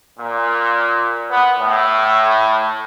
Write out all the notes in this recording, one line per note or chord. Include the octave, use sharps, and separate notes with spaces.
A#2
B3
A2